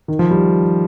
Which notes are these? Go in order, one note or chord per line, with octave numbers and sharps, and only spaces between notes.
D#3
F3
G3